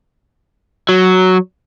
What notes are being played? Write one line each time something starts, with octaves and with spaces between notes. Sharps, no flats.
F#3